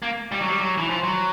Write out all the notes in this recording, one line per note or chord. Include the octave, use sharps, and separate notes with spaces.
A#3
G3
F#3
G3
F#3
E3
F3
F#3